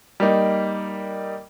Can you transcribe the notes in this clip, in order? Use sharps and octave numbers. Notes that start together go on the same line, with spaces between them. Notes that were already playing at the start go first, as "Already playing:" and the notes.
G3 A#3 D#4